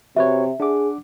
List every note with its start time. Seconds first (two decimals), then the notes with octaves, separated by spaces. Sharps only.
0.16 C3 F#4 B4 C#5 E5
0.60 D4 G#4 F#5 D6